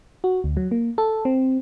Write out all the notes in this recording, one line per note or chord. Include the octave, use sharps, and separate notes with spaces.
F#4
D2
F#3
A#3
A4
C4